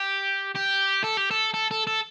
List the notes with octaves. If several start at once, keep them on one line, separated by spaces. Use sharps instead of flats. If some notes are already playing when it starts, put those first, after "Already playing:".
Already playing: G4
G4
A4
G4
A4
A4
A4
A4